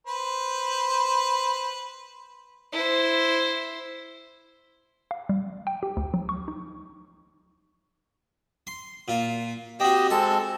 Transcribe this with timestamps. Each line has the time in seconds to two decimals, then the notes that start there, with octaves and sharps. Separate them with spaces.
0.07 B4 C5
2.73 E4 C5
5.11 F5
5.29 G3
5.67 G5
5.83 G4
5.97 D2
6.14 F#3
6.29 C#6
6.48 D#4
8.67 C6
9.08 A#2 F4
9.80 C4 F#4 G4 D#5
10.10 G#3 C4 A4 A5